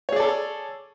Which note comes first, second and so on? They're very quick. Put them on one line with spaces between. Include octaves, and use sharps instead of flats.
C#5 G#4 D5 A4